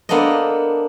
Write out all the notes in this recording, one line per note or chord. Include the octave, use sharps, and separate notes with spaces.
A#3 B3 D4 A4 C5 D#5